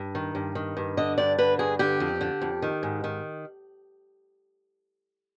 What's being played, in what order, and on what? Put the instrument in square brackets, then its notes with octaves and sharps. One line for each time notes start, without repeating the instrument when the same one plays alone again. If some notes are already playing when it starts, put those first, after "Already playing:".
Already playing: [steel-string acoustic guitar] G2
D#3
G2
D#3
G2
D3 D#5
G2 D5
D3 B4
G2 G#4
D3 G4
F2
D3
F2
D#3
G#2
D#3